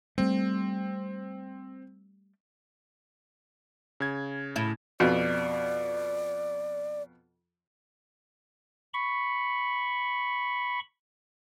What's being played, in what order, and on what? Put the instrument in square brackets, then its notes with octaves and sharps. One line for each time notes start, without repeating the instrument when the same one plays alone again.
[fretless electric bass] G3 A3 [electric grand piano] C4
[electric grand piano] C#3 G#6
[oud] A2 E4
[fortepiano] F2 B2 [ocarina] D5
[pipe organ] B5 C#6